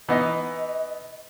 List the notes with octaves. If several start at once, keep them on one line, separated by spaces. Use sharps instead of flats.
E3 B3 D#4 D#5